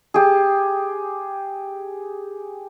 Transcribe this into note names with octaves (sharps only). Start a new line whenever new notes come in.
G4 G#4